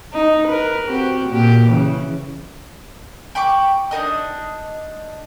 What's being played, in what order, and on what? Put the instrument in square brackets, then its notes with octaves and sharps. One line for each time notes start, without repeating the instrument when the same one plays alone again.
[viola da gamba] D#4
A#4 B4
C4 F#4 G4
A#2 G4
C#3 E3
[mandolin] G5 B5 C#6 D6
D4 D#4 A#4 D#5